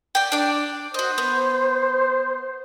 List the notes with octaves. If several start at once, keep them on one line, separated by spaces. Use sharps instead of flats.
D5 G5
D4 D5
F#4 C5 D#5
B3